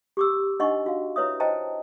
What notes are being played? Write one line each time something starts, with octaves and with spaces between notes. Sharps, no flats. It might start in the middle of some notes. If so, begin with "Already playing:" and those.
G4 D6 E6
D4 D#4 D#5 F#5 C6 C#6
F#4 F5
E4 B4 C#5 E5 D#6
C5 D#5 G5 A5 A#5